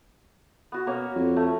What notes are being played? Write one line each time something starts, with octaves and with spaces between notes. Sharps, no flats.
B3 F#4
B2 A#3 C#4 C#5
F2
A3